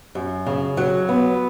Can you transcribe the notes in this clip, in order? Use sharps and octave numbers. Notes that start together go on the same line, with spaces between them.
F#2
C#3
F#3
B3